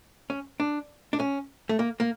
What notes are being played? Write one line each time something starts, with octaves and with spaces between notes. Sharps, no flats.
C#4
D4
D4
C#4
A3
A#3
A#3